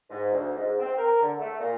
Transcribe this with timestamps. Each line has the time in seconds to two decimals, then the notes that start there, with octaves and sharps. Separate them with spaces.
0.10 G#2
0.32 D2
0.55 G#2
0.80 C4
0.97 A#4
1.20 D3
1.40 A3
1.59 A#2